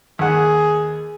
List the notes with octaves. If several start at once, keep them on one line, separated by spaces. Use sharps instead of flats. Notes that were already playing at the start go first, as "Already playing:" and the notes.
D#2 G#4 F#5